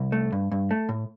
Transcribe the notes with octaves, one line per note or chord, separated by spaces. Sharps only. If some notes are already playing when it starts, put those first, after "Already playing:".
Already playing: C2
A3
G2
G2
A3
A2